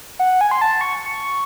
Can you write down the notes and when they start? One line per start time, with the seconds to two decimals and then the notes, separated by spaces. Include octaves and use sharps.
0.19 F#5
0.41 G#5
0.51 C6
0.61 A5
0.81 C#6
1.05 C#6